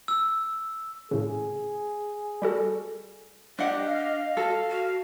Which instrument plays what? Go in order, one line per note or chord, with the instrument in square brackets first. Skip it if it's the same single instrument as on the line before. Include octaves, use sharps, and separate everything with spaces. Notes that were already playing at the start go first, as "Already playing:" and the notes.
[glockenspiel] E6
[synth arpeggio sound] A2 C#3 [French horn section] G#4
[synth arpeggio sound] G3 F#4 A4
[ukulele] D4 F#5 [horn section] G4 [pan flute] D#5
[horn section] F5
[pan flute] F#4 [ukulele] A4
[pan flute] F#4